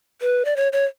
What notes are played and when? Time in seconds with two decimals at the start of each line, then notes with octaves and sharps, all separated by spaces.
0.22 B4
0.45 D5
0.57 C#5
0.73 C#5